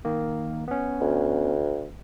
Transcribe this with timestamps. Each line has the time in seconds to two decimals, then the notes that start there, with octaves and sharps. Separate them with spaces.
0.05 D#3 A#3
0.68 B3 C#4
1.01 D2